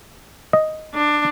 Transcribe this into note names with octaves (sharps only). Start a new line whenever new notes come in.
D#5
D4